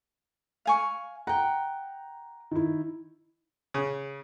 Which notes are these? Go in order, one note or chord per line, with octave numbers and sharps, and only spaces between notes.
F5 G#5 C#6
F#5 G5 A#5
D#3 E4
C#3